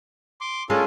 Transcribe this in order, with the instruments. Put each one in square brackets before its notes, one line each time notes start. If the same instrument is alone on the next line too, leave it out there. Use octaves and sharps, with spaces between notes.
[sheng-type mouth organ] C6 D6
[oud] G#3 A#3 D4 [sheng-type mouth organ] C#4 F4 A4